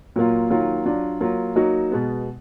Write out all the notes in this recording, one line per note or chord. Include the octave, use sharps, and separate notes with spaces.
A#2 F#3 A#3 F4
D#3 F#3 A#3 F4
F#3 D4 F4
F#3 A#3 F4
F#3 A#3 D#4 F#4
B2 G#3 B3